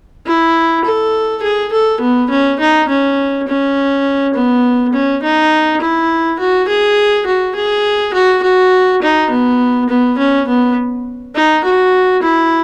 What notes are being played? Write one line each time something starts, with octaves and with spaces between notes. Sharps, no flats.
E4
A4
G#4
A4
B3
C#4
D#4
C#4
C#4
B3
C#4
D#4
E4
F#4
G#4
F#4
G#4
F#4
F#4
D#4
B3
B3
C#4
B3
D#4
F#4
E4